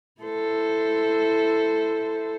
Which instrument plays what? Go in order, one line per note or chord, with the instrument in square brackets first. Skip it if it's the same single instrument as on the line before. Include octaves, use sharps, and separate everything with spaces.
[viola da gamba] E4 A4 C5